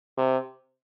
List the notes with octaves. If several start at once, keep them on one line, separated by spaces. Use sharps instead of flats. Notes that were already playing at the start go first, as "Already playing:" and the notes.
C3